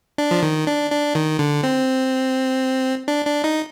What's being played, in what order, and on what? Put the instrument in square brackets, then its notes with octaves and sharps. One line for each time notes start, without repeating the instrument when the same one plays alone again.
[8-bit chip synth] D4
F3
D#3
D4
D4
D#3
D3
C4
D4
D4
D#4